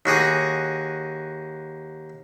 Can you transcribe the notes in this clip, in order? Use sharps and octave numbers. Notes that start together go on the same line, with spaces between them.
D#2 F#4 G#4 D#6